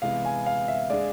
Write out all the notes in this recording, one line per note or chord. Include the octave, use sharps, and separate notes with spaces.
C3 E3 G#3 B3 E4 F5
G#5
F5
E5
G#3 D4 G#4 D5